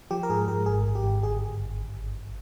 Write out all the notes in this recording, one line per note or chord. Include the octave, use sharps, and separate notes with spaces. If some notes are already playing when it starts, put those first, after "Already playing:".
F3 G4
A#4
G#2 G#4
G#2 A#4
G#1 G#4
G#1
G4
G#1
G1 G#4